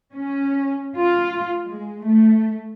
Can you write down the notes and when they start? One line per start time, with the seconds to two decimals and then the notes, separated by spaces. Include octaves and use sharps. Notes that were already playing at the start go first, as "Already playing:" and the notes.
0.12 C#4
0.95 F4
1.65 G#3
2.04 A3